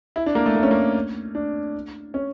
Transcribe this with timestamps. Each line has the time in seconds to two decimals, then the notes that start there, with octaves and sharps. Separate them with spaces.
0.16 E4
0.26 D4
0.35 A#3
0.46 A3
0.56 A#3
0.63 C#4
0.71 A#3
1.35 D4
2.14 C#4